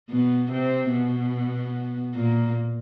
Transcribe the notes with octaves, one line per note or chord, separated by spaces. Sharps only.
B2 B3
C3 C4
B2 B3
A#2 A#3